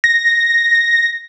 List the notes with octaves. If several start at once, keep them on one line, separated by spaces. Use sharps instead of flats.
A#6